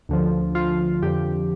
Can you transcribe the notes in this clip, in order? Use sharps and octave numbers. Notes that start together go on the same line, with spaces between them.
D2 D3 F3
F4
F2 D3 F3 G4